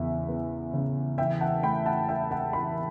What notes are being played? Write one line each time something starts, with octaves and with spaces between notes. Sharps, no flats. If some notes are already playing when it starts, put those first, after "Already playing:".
Already playing: E2 C#3 E5
B3
C#3
E3 E5 G5
F#5 A5
A3 G5 B5
F#5 A5
E4 E5 G5
F#5 A5
E3 G5 B5